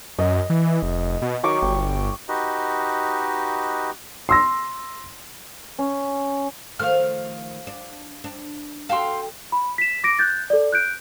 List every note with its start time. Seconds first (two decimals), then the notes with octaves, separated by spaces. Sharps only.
0.19 F#2 D#5
0.50 E3
0.83 F1
1.22 B2
1.43 D#3 F#3 C#6 D6
1.62 G1 G5
2.29 D#4 F#4 G4 B4 D#5
4.29 C6 E6 A#6
5.79 C#4
6.79 D#3 F3 A3 F5 F6
7.67 D4
8.24 D4
8.89 F#4 A4 F5 G5 C6
9.52 B5
9.78 B6 E7
10.04 D6 A#6 D7
10.19 F#6 G6 A6
10.50 A4 D5
10.72 F#6 G6 D7